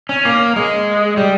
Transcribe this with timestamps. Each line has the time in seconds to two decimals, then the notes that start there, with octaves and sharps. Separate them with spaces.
0.09 C#4
0.25 A#3
0.56 G#3
1.17 G3